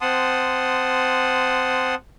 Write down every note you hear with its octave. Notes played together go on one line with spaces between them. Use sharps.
C4 F#5 A5 C6 D#6